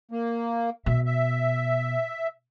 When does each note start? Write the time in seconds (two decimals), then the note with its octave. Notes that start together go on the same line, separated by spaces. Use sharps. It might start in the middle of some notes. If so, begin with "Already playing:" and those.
0.11 A#3
0.86 B2 E5
1.06 E5